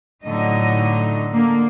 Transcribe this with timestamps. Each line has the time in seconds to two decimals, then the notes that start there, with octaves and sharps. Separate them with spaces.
0.24 A2 D3 F#3 D#4 D#5
1.31 D3 A#3